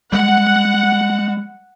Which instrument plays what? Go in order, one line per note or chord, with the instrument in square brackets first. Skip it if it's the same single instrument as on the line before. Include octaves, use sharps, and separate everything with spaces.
[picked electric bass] G3 G#3 [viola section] F#5